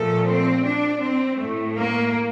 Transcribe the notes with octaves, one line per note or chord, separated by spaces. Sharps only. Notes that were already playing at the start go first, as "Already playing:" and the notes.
Already playing: A#2 F3 A3 A4
C4
D4
C4
A2 A3
A#3